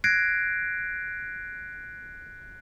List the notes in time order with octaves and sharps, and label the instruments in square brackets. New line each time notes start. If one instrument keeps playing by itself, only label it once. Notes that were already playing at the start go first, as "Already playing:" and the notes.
[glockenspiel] F#6 G#6 A#6 C7 D7